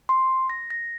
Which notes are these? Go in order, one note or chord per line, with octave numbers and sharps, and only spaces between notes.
C6
A#6
A#6